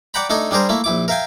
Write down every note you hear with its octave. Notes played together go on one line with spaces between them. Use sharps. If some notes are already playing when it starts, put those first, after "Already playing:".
D5 F#5 G5 A#5 B5
A3 D4 D#4 A4 G#5
G3 D4 G#4 A#4 C5
A3 A#3 E4
A#1 E4 D6
A#4 E5 F5 G5 G#5